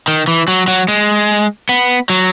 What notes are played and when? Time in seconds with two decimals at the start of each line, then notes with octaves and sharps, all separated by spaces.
0.08 D#3
0.28 E3
0.48 F#3
0.68 F#3
0.88 G#3
1.69 B3
2.10 F#3